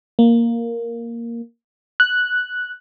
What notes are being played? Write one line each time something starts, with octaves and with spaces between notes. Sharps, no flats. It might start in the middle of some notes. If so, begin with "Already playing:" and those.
A#3
F#6